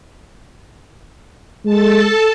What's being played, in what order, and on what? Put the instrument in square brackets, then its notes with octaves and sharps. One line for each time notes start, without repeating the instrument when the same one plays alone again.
[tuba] G#3 [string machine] A4 A5